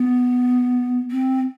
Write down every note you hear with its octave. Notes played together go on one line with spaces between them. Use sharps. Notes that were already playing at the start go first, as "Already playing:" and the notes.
Already playing: B3
C4